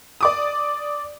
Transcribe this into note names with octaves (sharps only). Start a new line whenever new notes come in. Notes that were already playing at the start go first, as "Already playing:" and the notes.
D5 D6 D#6